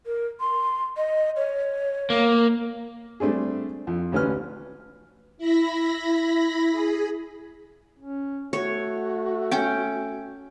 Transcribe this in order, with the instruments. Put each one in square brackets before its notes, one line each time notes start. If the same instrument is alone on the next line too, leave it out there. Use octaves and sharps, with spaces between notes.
[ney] A#4
C6
D#5
C#5
[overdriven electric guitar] A#3
[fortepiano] G3 A3 C4 D4 G#4
F2 F3
A1 D2 C#4 B4 F6
[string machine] E4 B5 A#6
G#4
[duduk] C#4
[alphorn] A3 [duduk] F#4 [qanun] C#5
[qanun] C#4 G5